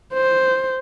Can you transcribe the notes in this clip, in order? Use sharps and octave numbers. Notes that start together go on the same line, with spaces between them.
C5